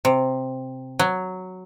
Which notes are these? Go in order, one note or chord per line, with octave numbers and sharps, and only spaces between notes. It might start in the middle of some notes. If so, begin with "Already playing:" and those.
C3
F#3